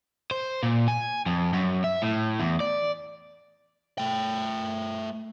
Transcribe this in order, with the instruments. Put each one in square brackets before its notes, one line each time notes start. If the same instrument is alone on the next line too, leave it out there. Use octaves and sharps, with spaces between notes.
[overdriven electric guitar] C5
A#2
G#5
F2
F#2
E5
A2
E2
D5
[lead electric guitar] A3 G5